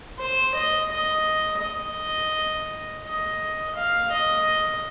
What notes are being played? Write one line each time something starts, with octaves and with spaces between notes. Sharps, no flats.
C5
D#5
D#5
D#5
D#5
F5
D#5